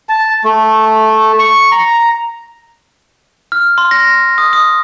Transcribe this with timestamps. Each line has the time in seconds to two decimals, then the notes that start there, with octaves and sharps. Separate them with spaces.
0.09 A5
0.44 A3
1.39 C#6
1.72 A#5
3.52 F6
3.78 C6
3.91 A#6
4.38 D#6
4.53 D#6